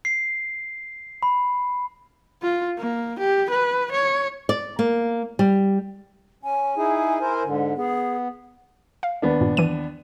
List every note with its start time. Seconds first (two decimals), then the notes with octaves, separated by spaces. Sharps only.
0.05 C7
1.23 B5
2.42 F4
2.78 A#3
3.19 G4
3.50 B4
3.91 C#5
4.49 D5
4.79 A#3
5.39 G3
6.43 C#4 G#5
6.77 D#4 E4 G#4
7.21 E4 A#4 C5
7.44 G#2 D3
7.76 B3 G#4
9.03 F5
9.22 D#2 B3 D4
9.41 G2 A#2
9.57 E3 D#7